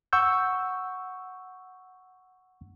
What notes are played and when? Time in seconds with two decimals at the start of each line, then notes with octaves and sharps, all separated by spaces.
0.13 F#5 C#6 E6 G6